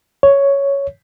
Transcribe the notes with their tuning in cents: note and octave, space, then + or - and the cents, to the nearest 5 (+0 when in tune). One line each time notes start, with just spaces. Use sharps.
C#5 +5